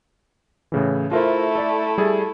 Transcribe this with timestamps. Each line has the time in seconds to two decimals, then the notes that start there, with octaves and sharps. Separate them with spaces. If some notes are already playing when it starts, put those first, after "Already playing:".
0.72 A2 C#3 E3
1.11 A3 E4 F4 A#4 C5
1.55 A4 D5 E5
1.98 G3 G#4 A4